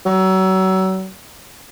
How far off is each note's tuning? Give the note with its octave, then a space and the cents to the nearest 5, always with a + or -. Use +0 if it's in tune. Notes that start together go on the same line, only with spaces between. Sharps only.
F#3 +35